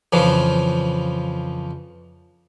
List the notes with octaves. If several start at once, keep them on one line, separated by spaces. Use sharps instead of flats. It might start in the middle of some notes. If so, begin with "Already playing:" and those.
F2 C#3 E3 F3